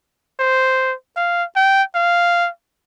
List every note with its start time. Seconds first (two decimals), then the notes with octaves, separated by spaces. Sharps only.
0.39 C5
1.17 F5
1.56 G5
1.95 F5